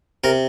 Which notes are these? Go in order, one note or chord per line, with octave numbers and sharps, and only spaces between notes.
C3 A#4